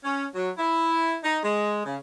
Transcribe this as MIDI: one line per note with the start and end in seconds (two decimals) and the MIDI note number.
0.04 0.26 61
0.34 0.50 54
0.57 1.18 64
1.24 1.39 63
1.43 1.82 56
1.86 1.96 49